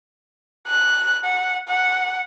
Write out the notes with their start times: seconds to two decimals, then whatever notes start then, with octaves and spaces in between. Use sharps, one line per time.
0.67 F#6
1.24 F#5
1.68 F#5